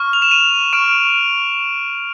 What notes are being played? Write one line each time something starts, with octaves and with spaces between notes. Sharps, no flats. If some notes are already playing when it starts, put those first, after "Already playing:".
Already playing: C#6 F6
F7
E7
D#7
C#6 F6 D7